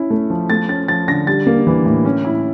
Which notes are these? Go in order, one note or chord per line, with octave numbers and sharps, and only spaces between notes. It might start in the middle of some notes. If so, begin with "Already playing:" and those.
Already playing: C#4 E4
A3
F3
A3 A6
C#4 A6
F3 A6
D3 A#6
G3 A6
A#3
E3
A2
C#4
E4